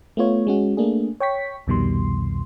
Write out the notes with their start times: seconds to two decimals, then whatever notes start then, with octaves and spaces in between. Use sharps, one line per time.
0.17 A3 B3 F4 C#5
0.47 G#3 C#4 F#4
0.77 A3 A#3 D4 G#4
1.20 C#5 G5 C#6 B6
1.67 C2 F2 B2 D#3 G3 C6